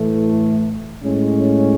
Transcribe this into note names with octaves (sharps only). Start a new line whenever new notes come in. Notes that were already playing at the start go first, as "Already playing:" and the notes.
Already playing: A2 E3 A3
A2 G#3 C#4